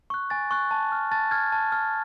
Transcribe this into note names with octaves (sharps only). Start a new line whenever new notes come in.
C#6 F#6
G#5 A6
C#6 F#6
A5
F6
A5 A6
F6 G#6
A5
F6